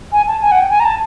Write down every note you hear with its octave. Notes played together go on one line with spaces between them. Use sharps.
G#5
A5
G#5
F#5
G5
G#5
A#5
A5